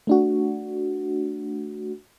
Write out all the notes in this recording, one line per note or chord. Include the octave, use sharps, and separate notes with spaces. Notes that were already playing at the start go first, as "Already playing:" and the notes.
A3 D4 F#4